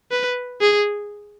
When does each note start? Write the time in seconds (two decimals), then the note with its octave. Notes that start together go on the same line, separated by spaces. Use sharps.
0.11 B4
0.61 G#4